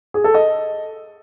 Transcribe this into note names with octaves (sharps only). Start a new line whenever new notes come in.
G#4
A4
D#5